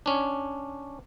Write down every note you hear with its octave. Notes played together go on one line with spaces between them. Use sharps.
C#4 D4